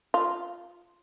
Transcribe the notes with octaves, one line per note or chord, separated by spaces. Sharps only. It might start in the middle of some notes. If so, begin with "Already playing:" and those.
F4